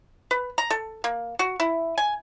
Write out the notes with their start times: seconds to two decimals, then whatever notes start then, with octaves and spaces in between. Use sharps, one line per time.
0.31 B4
0.58 A#5
0.70 A4
1.04 A#3
1.39 F#4
1.60 E4
1.98 G#5